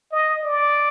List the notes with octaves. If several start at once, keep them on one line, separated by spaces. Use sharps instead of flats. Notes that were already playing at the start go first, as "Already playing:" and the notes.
D#5
D5